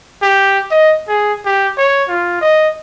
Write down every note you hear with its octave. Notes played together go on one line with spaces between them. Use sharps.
G4
D#5
G#4
G4
C#5
F4
D#5